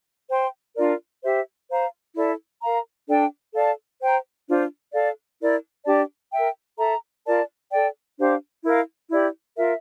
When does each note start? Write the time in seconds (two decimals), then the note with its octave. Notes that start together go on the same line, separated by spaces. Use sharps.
0.30 C5 G5 C6
0.76 D4 F4 A#4 D5
1.23 G4 C5 E5
1.69 C5 F5 A#5
2.16 E4 A4 D5
2.62 A#4 F5 A#5
3.08 D4 A4 D5 G5
3.54 A4 D5 F5 A5
4.01 C5 G5 A#5
4.47 D4 F4 C5
4.93 A4 D5 F5
5.39 E4 A#4 D5
5.85 D4 G4 D5 A5
6.32 A#4 E5 G5
6.79 A4 E5 A#5
7.25 F4 A#4 D5 A5
7.70 A4 D5 G5
8.17 D4 G4 C5 F5
8.64 E4 A#4 F5
9.10 E4 G4 D5
9.56 F4 A#4 E5